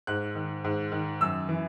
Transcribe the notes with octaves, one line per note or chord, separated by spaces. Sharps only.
G#2 F#6
D#3
G#2
D#3
F#2 E6
E3